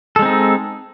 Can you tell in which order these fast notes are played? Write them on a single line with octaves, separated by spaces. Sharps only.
A4 G#3 C4 D#4